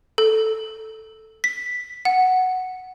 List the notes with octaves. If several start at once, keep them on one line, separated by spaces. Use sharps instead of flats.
A4
B6
F#5